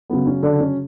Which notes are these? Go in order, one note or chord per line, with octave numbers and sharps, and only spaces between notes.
C#3 F#3 B3
C#4
D3 D4
C#4